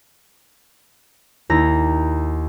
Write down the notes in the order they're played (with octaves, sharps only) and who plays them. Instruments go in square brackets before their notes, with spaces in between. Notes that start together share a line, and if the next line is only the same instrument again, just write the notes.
[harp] D#2 E4 A#5 A#6